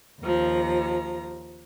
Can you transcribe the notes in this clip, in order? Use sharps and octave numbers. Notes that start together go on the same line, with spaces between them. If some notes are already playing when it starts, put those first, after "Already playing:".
D#2 F3 A#5